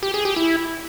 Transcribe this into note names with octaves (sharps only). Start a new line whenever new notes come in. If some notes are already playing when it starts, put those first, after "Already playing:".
G4
G#4
G4
E4